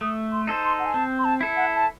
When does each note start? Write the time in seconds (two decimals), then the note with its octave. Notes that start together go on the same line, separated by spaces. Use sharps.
0.01 A3 D#6
0.32 C6
0.47 D#4 A4 C5
0.64 C6
0.79 F#5
0.86 G#5
0.94 C4 A5
1.19 C6
1.25 A5
1.41 E4 A4
1.56 F#5
1.75 A5